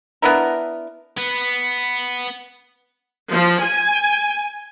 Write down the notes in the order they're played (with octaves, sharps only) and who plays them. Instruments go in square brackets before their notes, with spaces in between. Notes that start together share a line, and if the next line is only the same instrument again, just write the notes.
[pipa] B3 D4 E4 A#4
[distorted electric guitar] B3 B4
[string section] F3
G#5